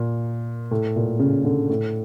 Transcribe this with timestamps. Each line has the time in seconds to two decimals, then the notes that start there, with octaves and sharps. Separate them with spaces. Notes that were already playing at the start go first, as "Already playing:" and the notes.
Already playing: A#2
0.71 A2
0.96 A#2
1.19 C#3
1.45 D3
1.69 A2